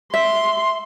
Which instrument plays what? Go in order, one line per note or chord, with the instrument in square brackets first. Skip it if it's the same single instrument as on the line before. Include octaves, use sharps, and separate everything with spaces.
[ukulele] E5 [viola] C6